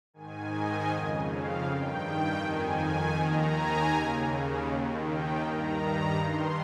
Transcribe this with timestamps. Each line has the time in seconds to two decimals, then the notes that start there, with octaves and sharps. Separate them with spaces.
0.14 G#2 D#3 G#5
0.51 D#5
0.90 F2 C#3
1.27 F5
1.64 G2 D#3 G5
2.39 F2 D#3 G#5
3.15 D#2 D#3 A#5
3.53 G#5
3.90 D#2 C#3
4.65 D#2 D#3
5.03 G5
5.41 G2 D#3 A#5
6.16 G2 D#3 C6